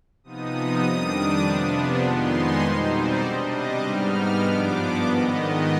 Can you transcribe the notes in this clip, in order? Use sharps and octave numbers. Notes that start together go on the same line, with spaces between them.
C3 F3 B3 D#4 D#6
F2 D#3 G3 D4
D6
C3 F3 B3 D4
F2 D#3 G#3 B3 D#4 C6
G#5
B2 G3 C4 D#4 C5
D5
C3 G3 D4 D#5
D6
G#2 G3 B3 D#4 F6
G2 F3 B3 D4 D6
G#2 D#3 B3 D#5